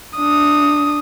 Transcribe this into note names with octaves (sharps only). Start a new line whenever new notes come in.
D4 D#6